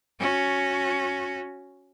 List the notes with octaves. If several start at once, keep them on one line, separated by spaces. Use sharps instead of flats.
C#4 F#4